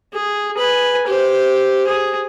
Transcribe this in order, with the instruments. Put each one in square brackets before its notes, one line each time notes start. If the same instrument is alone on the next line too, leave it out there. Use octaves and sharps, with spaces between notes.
[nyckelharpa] G#4
B4 G#5
G4 C5
G#4